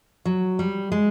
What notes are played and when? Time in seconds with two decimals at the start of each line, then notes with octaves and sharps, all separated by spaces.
0.25 F#3
0.59 G3
0.92 G#3